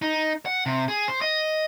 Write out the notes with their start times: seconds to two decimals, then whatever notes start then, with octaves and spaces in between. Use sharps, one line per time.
0.02 D#4
0.46 F#5
0.66 C3
0.88 G#4
1.08 C5
1.21 D#5